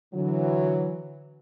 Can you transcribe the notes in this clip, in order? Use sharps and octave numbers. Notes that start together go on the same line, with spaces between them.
D3 E3 F#3